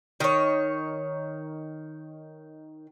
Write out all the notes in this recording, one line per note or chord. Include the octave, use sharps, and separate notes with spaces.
D#3 C#5